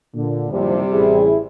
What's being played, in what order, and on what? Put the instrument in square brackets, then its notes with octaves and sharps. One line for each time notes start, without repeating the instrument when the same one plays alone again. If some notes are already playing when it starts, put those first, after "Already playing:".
[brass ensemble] A#2 D3
[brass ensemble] F#1 D#2 F3 [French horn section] C3 G3
[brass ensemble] A1 E4 G#4